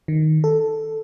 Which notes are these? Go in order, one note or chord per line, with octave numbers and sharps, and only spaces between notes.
D#3
A4